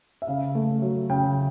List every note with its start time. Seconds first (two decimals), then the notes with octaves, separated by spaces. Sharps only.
0.22 E5
0.27 C#3 F5
0.55 A3
0.82 F#3
1.10 C#3 G5